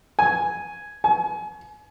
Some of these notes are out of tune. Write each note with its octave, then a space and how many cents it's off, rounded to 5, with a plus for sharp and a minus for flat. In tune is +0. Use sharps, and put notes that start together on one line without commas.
G#5 +0
G#5 +30